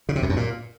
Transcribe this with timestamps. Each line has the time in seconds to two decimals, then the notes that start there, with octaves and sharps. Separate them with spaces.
0.09 C#3
0.16 C3
0.23 F2
0.29 F#2
0.36 A#2